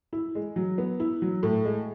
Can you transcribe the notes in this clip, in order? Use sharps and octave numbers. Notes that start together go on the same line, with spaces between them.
E4
G#3
F#3
B3
E4
F#3
A2
G#3